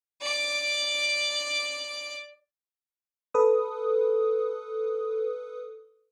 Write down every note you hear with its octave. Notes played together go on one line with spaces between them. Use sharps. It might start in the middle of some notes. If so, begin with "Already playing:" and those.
D5 D6
A4 B4 D#6